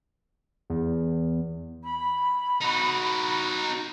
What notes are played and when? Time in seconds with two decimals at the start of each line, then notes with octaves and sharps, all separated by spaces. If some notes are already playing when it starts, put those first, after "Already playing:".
0.70 E2
1.84 B5
2.61 D#4 F#4